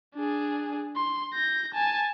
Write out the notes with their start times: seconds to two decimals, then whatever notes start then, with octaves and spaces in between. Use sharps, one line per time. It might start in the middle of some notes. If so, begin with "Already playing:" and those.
0.15 D4 G#4
0.96 C6
1.34 G6 A#6
1.74 G#5 A5